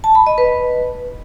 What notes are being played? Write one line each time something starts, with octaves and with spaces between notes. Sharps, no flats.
A5
B5
D#5
B4